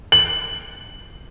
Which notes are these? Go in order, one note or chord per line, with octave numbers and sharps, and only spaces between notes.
F#7